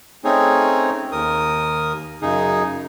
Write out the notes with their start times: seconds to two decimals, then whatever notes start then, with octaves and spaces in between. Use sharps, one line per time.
0.25 A3 C4 C#4 D#4 G#4 C#5
1.12 D#2 A#4 D#6
2.22 F#2 C#3 D#4 G#4